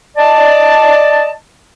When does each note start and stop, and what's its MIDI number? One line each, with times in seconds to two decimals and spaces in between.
0.17 1.30 74
0.17 1.30 75
0.17 1.30 81